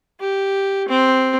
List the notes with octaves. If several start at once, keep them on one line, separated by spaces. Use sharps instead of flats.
G4
C4